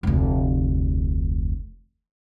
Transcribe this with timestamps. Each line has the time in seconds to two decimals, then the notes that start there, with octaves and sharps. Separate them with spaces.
0.03 F1 D2